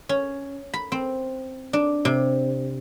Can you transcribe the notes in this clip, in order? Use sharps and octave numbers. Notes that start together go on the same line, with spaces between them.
C#4
B5
C4
D4
C3